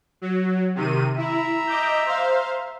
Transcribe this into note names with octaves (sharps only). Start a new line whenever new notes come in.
F#3
C3 D#3 D#7
E4 E5 A#5
D#5 D6 G6
C5 F5